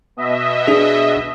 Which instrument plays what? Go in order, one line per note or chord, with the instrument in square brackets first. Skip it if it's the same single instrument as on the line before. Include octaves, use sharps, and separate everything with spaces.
[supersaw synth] B2 D#5 E5
[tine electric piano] D4 G#4